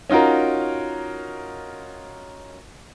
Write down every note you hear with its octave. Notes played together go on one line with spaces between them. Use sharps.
C#4 D#4 F4 F#4 A#4